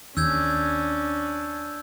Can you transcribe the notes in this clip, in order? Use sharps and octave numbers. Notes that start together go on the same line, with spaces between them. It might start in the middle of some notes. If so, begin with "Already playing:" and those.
D#2 C#4 D4 E6 G6 G#6